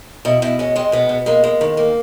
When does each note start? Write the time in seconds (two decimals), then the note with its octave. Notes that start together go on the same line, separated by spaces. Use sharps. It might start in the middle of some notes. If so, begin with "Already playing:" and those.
0.25 B2 E4
0.42 B2 E4
0.59 G#3 C#4
0.76 G#3 C4
0.92 B2 B3
1.09 B2
1.26 G#3 A#3
1.44 G#3
1.61 D#3
1.77 A#3